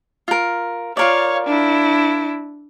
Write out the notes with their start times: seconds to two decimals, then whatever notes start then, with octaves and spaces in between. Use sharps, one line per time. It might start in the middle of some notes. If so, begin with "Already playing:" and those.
0.28 F4 A#4
0.97 F4 A#4 C#5 D5 F5
1.47 D4 E4